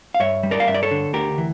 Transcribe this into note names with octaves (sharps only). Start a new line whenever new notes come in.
F5
G2 C#5 E5
G3
A#4 D5
F5
G2 E5
D5
A4 C#5
D3
D2 G4 A#4
E3